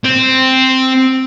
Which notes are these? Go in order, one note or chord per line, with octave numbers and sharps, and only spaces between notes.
C4